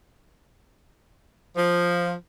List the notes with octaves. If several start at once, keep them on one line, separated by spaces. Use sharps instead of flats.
F3